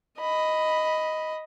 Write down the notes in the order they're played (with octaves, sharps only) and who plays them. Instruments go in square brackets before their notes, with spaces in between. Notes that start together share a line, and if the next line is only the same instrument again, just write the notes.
[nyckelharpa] D#5 [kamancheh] B5